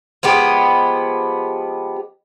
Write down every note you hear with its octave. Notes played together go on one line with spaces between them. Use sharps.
F3 G#3 B3 G4